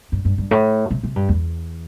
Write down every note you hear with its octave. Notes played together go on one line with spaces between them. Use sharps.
G2
G2
G2
A2
C3
C3
G2
E2